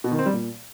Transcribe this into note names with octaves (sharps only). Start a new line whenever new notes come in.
B2
D#3
C4
G3
A#2